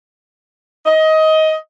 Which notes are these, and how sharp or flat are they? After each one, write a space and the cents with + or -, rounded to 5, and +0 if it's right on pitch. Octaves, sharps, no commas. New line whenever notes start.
D#5 +20